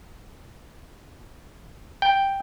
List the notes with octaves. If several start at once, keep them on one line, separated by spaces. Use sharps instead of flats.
G5